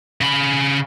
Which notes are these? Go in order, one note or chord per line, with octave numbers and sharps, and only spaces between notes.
C#3 B5